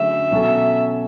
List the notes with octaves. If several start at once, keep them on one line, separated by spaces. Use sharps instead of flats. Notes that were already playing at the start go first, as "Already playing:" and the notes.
Already playing: D3 F#3 A3 C#4 G#4 E5
B2 F#3 C#4 F#4 A4